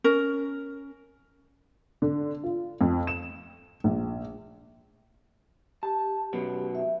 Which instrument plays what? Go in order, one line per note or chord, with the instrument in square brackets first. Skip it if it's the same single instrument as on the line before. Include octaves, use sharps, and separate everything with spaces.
[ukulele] C#4 A#4
[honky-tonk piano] D3
F4
F2
E7
A#1
[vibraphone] G4 [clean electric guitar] A5
[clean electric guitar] F#2 B2 B3
[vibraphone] E5